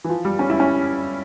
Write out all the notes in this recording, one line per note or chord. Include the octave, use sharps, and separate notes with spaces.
E3
F3
G3
C#4
E4
C#4